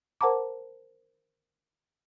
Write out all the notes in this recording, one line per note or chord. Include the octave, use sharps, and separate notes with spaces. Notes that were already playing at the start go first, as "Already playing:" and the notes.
A#4 C5 F#5 A5 A#5 D6